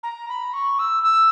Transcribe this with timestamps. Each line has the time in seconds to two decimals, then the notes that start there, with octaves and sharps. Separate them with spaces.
0.03 A#5
0.29 B5
0.53 C#6
0.79 E6
1.03 E6